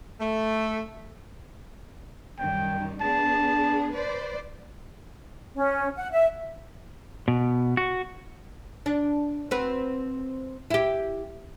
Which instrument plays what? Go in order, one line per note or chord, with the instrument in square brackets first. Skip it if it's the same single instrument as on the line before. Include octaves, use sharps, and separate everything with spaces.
[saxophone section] A3
[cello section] F#2 D#3 G3 [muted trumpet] G5
[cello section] B3 D4 G#4 [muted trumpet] A5
[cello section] B4 C5 D5
[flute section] C#4
F#5
E5
[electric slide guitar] B2
F#4
[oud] D4
C4 F#4 B4
E4 G4